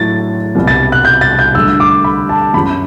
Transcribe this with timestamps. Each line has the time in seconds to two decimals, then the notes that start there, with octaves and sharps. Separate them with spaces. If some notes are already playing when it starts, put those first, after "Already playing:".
Already playing: A2 F#3 A6
0.55 C2 B2 G3
0.67 A6
0.92 F#6
1.05 G6
1.21 A6
1.39 G6
1.55 D2 D3 G3 E6
1.80 D6
2.04 B5
2.29 A5
2.54 F#2 F#3 B5